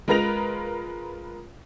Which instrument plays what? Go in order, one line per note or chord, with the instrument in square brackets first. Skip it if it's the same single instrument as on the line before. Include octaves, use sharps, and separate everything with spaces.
[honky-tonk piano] G#3 F4 A#4 B4 A#6 F7